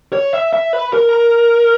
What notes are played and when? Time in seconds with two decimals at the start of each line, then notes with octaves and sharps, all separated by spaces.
0.13 C#5
0.33 E5
0.53 E5
0.73 B4
0.93 A#4